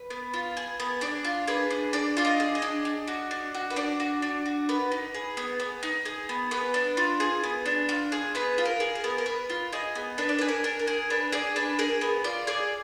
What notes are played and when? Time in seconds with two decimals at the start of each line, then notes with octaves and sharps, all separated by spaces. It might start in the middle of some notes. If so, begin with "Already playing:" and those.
Already playing: B4
0.10 B3
0.34 F4
0.57 G#4
0.80 B3
1.01 D4 D5
1.25 F4
1.48 G#4 B4
1.70 D4
1.93 D4 D5
2.17 F4 F5
2.25 D#5
2.40 G#4
2.55 D#5
2.62 D4
2.85 D4
3.07 F#4
3.31 D4
3.54 F#4
3.70 B4
3.76 D4 D5
4.00 F#4
4.22 D4
4.46 F#4
4.69 B3 B4
4.92 D#4
5.14 G#4
5.37 B3
5.60 B3
5.83 D#4
6.05 G#4
6.29 B3
6.51 B3 B4
6.74 D4
6.97 F4
7.20 G#4
7.44 B3
7.66 D4
7.89 F4
8.12 G#4
8.35 B3 B4
8.58 F4
8.65 A#4
8.80 G#4
8.95 A#4
9.04 B3
9.18 A#4
9.26 B3 B4
9.50 F4
9.72 G#4 D#5
9.95 B3
10.18 D4 B4
10.29 D5
10.39 G#4 B4
10.48 A#4
10.64 D4
10.79 A#4
10.87 G#4
11.10 D4 B4
11.32 G#4 D5
11.56 D4 B4
11.79 G#4 A#4
12.01 B3
12.24 F4 D5
12.47 G#4 D5